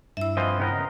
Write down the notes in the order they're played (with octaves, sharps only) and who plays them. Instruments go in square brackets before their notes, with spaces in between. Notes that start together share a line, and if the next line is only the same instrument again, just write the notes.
[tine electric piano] G2 E4 [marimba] E5 E6
[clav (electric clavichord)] E3 F3 C4 [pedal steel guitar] D#5
[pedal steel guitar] C#3 A#4 D#5 [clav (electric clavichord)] B3 C5 G5